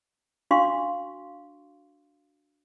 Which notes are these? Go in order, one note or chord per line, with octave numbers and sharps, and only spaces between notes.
D4 F#4 F5 C6 C#6